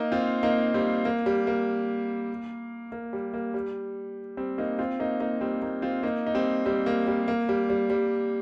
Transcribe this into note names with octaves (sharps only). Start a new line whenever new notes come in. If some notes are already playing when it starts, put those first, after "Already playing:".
Already playing: A#3 D#4
C4 F4
A#3 D#4
G3 C4
A#3
G3
A#3
A#3
G3
A#3
G3
G3 C4
A#3 D#4
C4 F4
A#3 D#4
A#3 D#4
G3 C4
A#3 D#4
C4 F4
A#3 D#4
D#4
G3 C4
G3 C4
A#3
G3
A#3
G3
G3
G3